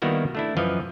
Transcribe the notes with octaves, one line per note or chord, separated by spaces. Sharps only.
D#3 G3 A#3 B3 E4 F#4
A3 D4 E4
F#2 E3 F3 B4 D#5 F5